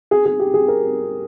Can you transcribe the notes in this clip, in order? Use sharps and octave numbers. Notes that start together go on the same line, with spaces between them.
G#4
G#4
G4
G#4
A#4